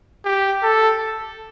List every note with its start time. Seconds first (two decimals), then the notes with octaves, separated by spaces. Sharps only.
0.25 G4
0.63 A4